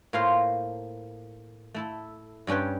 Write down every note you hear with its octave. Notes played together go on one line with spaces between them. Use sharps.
A2 A#3 F4 C5 F5
A3 E4 A4
G2 G3 C#4 B4 G5